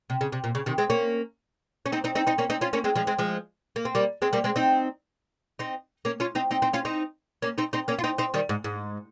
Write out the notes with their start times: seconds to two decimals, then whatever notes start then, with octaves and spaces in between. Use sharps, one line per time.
0.10 C3
0.21 C#3
0.32 C3
0.44 A#2
0.55 C#3
0.66 C3 D#3
0.78 G#3 C4
0.90 A#3 C#4
1.86 C#4
1.92 C4 D#4
2.04 C4 D#4
2.15 C4 D#4
2.27 C4 D#4
2.38 A#3 C#4
2.50 C4 D#4
2.61 C#4 F4
2.73 A#3 C#4
2.84 G#3 C4
2.95 F3 G#3
3.07 G#3 C4
3.19 F3 G#3
3.76 A#3
3.85 C4
3.95 G3 A#3
4.22 G#3 C4
4.33 G3 A#3
4.44 G#3 C4
4.56 C4 D#4
5.59 C4 D#4
6.05 A#3 C#4
6.20 C#4 F4
6.35 C4 D#4
6.51 C4 D#4
6.62 C4 D#4
6.73 C#4 F4
6.85 C4 D#4
7.42 A#3 C#4
7.58 C4 D#4
7.73 C4 D#4
7.88 A#3 C#4
7.99 F4
8.04 C4 D#4
8.18 C4 D#4
8.34 D#3 G3
8.49 G#2
8.64 G#2